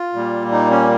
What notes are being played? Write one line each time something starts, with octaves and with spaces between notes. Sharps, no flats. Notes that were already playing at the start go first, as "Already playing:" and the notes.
Already playing: F4
A#2 G3 A#3
D#4
C#4